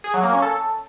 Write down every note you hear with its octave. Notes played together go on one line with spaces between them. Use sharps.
G#4
F#3
A#3
C#4
A4